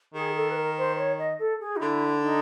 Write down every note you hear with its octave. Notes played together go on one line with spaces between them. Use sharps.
D#3 G#4
A4
B4
A#4
C5
C#5
D#5
A4
G#4
D#4
D3 E4
D#4